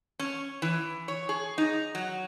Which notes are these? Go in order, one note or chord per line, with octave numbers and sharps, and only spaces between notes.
C#4
E3
C#5
G#4
D#4
F#3